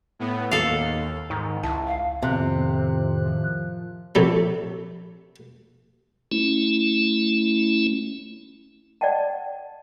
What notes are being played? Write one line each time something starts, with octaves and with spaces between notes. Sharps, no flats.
A2 B3
D#2 A4 F5
G#2 D#3
C#2 E4 A5
F5
F2 A2 C3 D#3 F#6
F3
A#1 C3 A3
A3 C#4 E4
D5 D#5 F#5 G5 A5